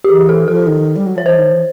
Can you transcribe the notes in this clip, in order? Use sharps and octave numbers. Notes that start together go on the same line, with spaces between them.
G4
E3 G#4
A4
F3 A4
D#3
G3
F#3
F3 C#5
E3 C5
D#3
E3